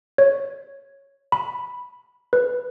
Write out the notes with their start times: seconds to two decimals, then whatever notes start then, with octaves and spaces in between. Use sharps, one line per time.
0.18 C#5
1.32 B5
2.33 B4